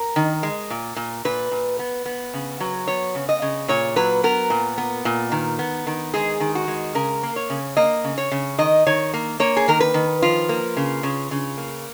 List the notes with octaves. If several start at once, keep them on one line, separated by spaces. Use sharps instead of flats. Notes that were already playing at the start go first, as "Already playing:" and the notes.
Already playing: A#4
D#3
G#3
A#2
A#2
A#2 B4
A#2
B3
B3
C#3
F#3
B3 C#5
C#3
D#5
C#3
A#2 C#5
F#3 B4
B3 A#4
A#2
B3
A#2
D#3
B3
D#3
G#3 G#4
D#3
F#4
G#3
C#3 A#4
A#3
C#5
C#3
A#3 D#5
C#3
C#5
C#3
D#3 D#5
D#3 C#5
A#3
A#3 C#5
G#4
D#3 A#4
B4
D#3
F3 F4
A#3
C#3
C#3
C#3
A#3